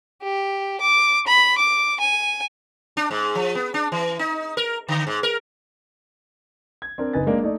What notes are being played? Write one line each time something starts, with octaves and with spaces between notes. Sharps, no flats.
G4
D6
B5
D6
G#5
D4
G#2
F3
B3
D4
E3
D#4
A#4
D3
G#2
A#4
G#6
C4 D4 A#4
F#1 D#4 B4 G#5 A6
G#3 A#3 D4
A3 D#4 D5